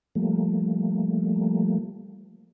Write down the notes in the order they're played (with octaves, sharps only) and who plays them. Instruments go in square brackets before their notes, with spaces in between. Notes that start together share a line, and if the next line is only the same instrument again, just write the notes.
[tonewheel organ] F3 G3 A3 A#3